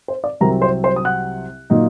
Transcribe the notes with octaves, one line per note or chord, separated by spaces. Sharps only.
C5
D5
C2 C3 F#3 C4 A#4 A#5
C5 C6
C5 C6
D#6
F#5 F#6
A#2 F#3 A#3 D#4